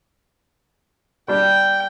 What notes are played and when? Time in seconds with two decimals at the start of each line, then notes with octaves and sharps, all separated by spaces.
1.28 G3 D4 G4 G5